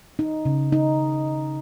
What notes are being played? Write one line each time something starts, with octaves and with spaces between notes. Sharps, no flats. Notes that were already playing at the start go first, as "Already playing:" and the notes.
D#4
C#3
D#4